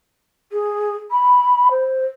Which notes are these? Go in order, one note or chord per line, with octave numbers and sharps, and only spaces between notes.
G#4
B5
C5